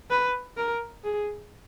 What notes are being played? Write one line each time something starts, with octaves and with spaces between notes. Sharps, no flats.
B4
A#4
G#4